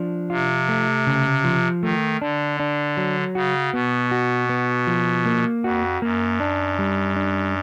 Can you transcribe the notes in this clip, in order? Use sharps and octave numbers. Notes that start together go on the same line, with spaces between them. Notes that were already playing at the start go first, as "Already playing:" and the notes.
Already playing: F3 D4
C3 F4
A3
C#3
F3
D#3 A3
D3 D4
D4
F#3
C#3 F#4
B2 B3
F#4
B3
F3
A#3
F2 F#4
F#2 A#3
D4
G3
D4